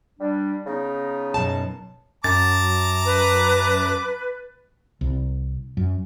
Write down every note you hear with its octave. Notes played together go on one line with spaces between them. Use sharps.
G3 D4
C#3 B3 D#4
F#2 B2 A5
F#2 A5 A#5 D6 A6
B4
C2
F#2